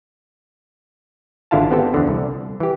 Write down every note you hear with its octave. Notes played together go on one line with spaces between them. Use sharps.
G#1 D3 E4 F4 F5 A5
B3 C4 G4 A4
E2 D3
C2
E3 G4